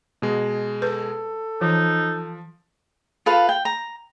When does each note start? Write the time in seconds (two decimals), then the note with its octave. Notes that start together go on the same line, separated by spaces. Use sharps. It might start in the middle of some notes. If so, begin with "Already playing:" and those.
0.22 B2 G#3
0.82 A4 B4
1.61 E3 F3 D#4
3.26 F4 A4 B4 F5
3.49 G5
3.65 A#5